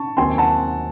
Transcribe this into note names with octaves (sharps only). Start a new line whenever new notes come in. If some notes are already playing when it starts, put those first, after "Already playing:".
Already playing: A5 C#6
D#2 D#3 F#3 C4 G#5 C6
F#5 A5